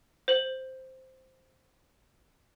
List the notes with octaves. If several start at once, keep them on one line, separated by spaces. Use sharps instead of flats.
C5 F#7